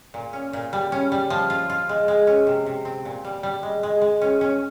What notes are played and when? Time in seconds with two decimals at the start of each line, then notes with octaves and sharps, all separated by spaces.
0.14 A#2
0.33 C#4
0.53 A#2
0.73 G3
0.92 C#4
1.12 G3
1.30 F3
1.50 F4
1.70 F4
1.89 G#3
2.08 G#3
2.27 C#4
2.47 C3
2.66 C3
2.85 C4
3.05 A#2
3.25 G3
3.43 G3
3.63 G#3
3.83 G#3
4.01 G#3
4.21 C#4
4.41 C#4